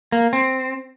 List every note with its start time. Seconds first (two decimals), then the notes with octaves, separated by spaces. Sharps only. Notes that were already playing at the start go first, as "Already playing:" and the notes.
0.12 A#3
0.33 C4